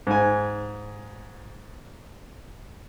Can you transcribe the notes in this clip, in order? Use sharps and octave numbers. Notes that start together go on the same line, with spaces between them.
G#2 G#5